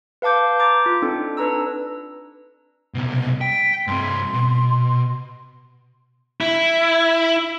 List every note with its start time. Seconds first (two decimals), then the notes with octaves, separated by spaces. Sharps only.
0.22 B4 F5 A5 D6 G6
0.59 A#5 D6 G6 A6
0.86 F4
1.02 C4 D4 D#4 A4
1.37 D4 B4 A#5 E6
2.95 C2 B2
3.41 G5 B6
3.87 G2 C4 C6
4.33 B2
6.41 E4